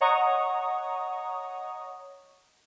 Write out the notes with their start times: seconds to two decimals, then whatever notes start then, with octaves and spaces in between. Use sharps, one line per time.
0.01 C#5 D#5 F#5 A#5 C#6 D#6